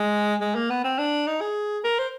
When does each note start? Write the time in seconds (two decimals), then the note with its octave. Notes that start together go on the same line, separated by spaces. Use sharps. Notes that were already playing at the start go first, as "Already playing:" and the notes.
Already playing: G#3
0.41 G#3
0.55 A#3
0.70 B3
0.84 C4
0.99 D4
1.27 D#4
1.41 G#4
1.84 A#4
1.99 C5